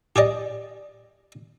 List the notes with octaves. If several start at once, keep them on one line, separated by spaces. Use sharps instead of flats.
G4 G#4 D5 D#5